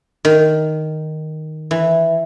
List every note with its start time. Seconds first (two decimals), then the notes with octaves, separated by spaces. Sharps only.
0.25 D#3
1.71 E3